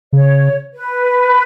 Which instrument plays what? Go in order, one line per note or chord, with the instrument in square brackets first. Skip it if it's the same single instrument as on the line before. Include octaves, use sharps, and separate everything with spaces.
[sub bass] C#3 [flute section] C#5
[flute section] B4